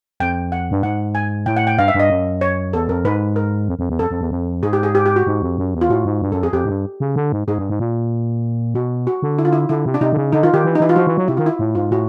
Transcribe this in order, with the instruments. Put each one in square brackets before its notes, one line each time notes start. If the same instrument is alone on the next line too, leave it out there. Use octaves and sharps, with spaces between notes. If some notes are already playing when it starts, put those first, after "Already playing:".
[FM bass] F2 [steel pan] G5
[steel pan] F#5
[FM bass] G2
[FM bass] G#2 [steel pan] F#5
[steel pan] G#5
[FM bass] A2 [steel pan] G5
[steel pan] F#5
G5
[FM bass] G2 [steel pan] F5
[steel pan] E5
[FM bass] G2
[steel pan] D#5
[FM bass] F#2
[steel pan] C#5
[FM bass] E2 [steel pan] A4
[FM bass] F2 [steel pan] A#4
[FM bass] G#2 [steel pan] B4
[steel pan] A#4
[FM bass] F2
F2
E2
[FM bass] F2 [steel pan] A4
[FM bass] F2
E2
F2
[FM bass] G#2 [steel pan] G#4
[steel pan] G4
G#4
G4
G4
F#4
[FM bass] G#2
F2
F#2
E2
[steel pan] F4
[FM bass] A2 [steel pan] F#4
[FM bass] G#2
G2
[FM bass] F#2 [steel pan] A4
[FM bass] F2 [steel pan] G#4
[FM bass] F2 [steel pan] G4
[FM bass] G#2
G2
C#3
D3
G#2
[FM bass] G#2 [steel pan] G#4
[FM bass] G2
G#2
A#2
[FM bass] B2 [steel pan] F#4
[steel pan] F#4
[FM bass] D3
[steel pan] E4
F4
E4
[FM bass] D3 [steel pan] E4
[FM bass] C3
[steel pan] D4
[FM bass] C3 [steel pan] D#4
[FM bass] D3
C#3
[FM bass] D3 [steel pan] D#4
[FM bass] D#3 [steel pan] F4
[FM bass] D#3 [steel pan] G4
[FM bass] E3
[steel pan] D#4
[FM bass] E3 [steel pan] E4
[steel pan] F4
[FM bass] F3 [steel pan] F#4
[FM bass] E3
F#3
[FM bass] C3 [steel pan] E4
[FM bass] D#3 [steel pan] F4
[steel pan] E4
[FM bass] A2
[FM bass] G#2 [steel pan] F4
[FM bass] A2 [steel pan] F#4